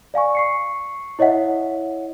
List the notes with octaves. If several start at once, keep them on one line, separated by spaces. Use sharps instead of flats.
D5 F5 G#5 C#6
C#6 C7 C#7
E4 C#5 D#5 E5 F#5